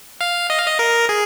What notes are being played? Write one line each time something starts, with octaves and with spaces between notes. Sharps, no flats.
F5
D#5
F5
D#5
A#4
G#4